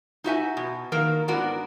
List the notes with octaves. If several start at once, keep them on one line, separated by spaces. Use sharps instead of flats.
D#4 F#4 E5 G#5
B2
D#3 A#3 A#4
G#2 B3 D4 F#4 A#4